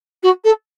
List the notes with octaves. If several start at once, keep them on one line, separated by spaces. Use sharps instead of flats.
F#4
A4